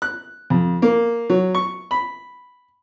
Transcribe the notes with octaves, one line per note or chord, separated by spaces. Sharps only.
F#6
F2
A#3
F#3
C#6
B5